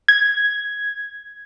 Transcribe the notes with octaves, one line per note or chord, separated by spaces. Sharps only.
G#6